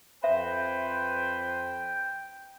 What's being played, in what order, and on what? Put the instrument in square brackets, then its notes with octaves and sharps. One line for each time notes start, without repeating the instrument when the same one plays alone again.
[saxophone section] F2 B4 C5 [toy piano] E5 [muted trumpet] G5